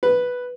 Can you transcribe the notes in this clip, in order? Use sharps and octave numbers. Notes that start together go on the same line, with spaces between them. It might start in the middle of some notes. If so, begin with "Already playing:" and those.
B4